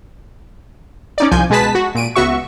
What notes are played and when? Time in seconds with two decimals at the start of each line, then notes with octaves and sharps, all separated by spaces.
1.18 C#4 D#4 D5
1.31 C2 F3 G#5 G6
1.50 B2 G#3 G#4 B4 A5 B6
1.75 F#4
1.95 A#2 D7 D#7
2.16 C#2 B3 F#4 E5 C#6